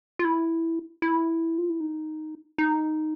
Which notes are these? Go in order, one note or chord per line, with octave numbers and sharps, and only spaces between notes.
F4
E4
E4
F4
E4
D#4
D#4